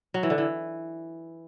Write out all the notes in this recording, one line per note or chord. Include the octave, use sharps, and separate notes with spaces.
F#3
E3
D3
E3